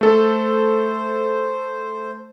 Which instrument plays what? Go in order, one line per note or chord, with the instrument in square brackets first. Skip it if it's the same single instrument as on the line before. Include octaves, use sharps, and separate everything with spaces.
[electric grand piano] A3 A4 [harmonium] C5